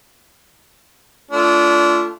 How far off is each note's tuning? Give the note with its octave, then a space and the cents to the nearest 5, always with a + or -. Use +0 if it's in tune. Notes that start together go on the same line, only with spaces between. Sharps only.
A3 +0 D4 -25 F4 -20